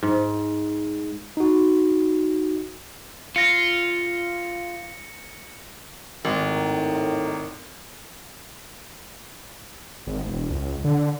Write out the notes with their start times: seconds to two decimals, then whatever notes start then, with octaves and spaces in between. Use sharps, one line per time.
0.03 G#2
1.37 D#4 F#4
3.36 F4 A#6 C#7
6.25 G#1 A2 D#3
10.07 G#1
10.27 E1
10.50 C#2
10.84 D3